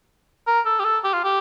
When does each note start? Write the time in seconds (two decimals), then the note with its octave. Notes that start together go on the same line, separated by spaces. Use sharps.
0.47 A#4
0.66 A4
0.80 G4
0.84 A4
1.04 G4
1.13 F4
1.24 G4